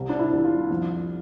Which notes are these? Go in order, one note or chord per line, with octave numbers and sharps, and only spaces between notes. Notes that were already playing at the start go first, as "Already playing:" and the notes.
Already playing: C2 C3
D4
E4
C2
F4
F2